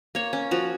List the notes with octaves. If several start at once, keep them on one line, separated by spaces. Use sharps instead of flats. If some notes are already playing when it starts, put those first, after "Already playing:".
A#3 C#5
C#4
F3 F#4